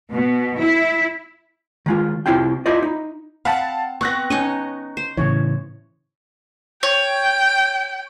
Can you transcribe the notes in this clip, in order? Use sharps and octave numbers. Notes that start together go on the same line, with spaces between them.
B2
E4
D#3 G#3 F4
C3 G3 C4 E4 F4 G5
E4 F4 C5 D5 D#5
D#4
C4 F5 F#5 A5 B5
B3 C4 C#6 F#6 A#6
C#4 D#4 C#5 D#5
C5
A2 C#3 E3 C#5
C#5 G5